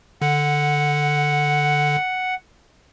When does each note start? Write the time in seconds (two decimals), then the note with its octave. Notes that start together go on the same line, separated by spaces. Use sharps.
0.22 D3 F#5